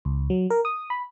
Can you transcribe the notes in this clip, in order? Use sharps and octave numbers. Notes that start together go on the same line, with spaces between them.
C#2
F#3
A#4
D#6
B5